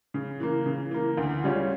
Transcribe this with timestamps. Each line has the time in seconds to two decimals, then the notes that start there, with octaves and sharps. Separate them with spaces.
0.14 C#3
0.40 E3 A#3
0.66 C#3
0.91 E3 A#3
1.18 D2
1.44 C#3 G3 C#4 F4